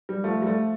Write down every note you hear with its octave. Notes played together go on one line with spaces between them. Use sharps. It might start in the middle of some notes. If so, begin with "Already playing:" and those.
G3
F3 A3
G3
F3 A3